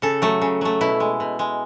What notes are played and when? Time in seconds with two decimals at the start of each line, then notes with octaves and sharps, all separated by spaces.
0.02 C#3 A4
0.22 F#3 A3
0.42 C#3
0.61 F#3 A3
0.81 B2 E4
1.00 G#3
1.20 B2
1.39 G#3